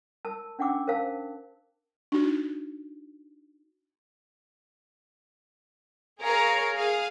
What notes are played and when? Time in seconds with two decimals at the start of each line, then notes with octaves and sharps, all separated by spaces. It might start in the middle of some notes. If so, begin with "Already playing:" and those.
0.25 A#4 A5 E6
0.59 C#4 D4 F#5 G5 D6 E6
0.87 A#4 C5 F5 A5
2.12 D4 D#4 F#4
6.22 G#4 A#4 C#5 F5 A#5
6.74 G#4 F5